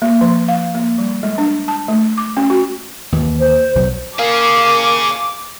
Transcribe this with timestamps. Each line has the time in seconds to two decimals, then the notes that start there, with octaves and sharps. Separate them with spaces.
0.02 A#3
0.21 F3
0.48 F5
0.74 A#3
0.98 G3
1.23 G#3
1.38 D4
1.68 A5
1.88 A3
2.18 D6
2.37 C#4
2.50 F#4
3.12 D#2 E3
3.40 C5
3.75 B1 F#3
4.19 A#3 C#4 G#4 F5 D6